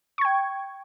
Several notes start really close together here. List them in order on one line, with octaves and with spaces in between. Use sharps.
C#6 G#6 G5